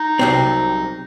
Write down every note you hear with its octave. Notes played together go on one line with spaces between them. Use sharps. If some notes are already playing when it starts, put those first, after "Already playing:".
Already playing: D#4
C2 C3 F#3 C4